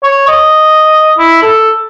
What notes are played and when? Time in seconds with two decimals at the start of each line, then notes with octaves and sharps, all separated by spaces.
0.04 C#5
0.28 D#5
1.18 E4
1.42 A4